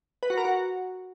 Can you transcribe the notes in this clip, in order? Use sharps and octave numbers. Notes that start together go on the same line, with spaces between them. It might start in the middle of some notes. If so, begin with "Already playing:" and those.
B4
F#4
A#4
F#4